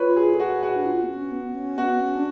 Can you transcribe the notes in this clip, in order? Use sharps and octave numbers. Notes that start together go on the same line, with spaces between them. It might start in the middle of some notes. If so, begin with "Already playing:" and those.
Already playing: F4 B4 C#5
G#4
A4
F#4 G#4
F#4
D4
F4
B3
C#4
B3
C#4
B3 F#4
C#4
D4